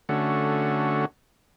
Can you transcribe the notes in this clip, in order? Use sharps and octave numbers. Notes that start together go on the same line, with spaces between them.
D3 A3 C#4 F#4